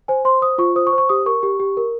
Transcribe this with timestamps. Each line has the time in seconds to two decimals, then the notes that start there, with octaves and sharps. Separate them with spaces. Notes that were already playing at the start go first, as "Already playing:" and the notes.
0.08 C5 G#5
0.25 C5 C6
0.42 C5 D#6
0.58 F4 C#6
0.76 C5 D#6
0.87 C#6
0.93 C5
0.98 C#6
1.09 G4 D#6
1.26 A#4 C#6
1.43 G4
1.60 G4
1.77 A#4